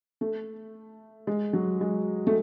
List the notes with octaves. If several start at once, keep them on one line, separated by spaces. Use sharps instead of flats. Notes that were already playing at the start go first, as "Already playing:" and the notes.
A3
G#3
F#3
G#3
A3